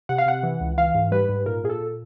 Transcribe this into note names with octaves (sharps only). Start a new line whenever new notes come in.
C3 F#5
F5
C3 F#5
E3
C#2
E3 F5
G#2
G3 B4
G#2
A#2 A#4
A#2 G#4
A4
A#2